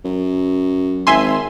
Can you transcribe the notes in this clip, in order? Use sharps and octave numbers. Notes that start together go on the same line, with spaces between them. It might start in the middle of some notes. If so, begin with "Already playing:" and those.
F#2
G#1 E5 G#5 C6